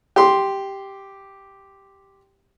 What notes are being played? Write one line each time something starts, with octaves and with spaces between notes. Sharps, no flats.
G4 C6